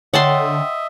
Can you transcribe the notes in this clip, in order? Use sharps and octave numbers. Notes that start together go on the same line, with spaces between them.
D3 C#5 D#5 E5 F#5 G5 A5 C6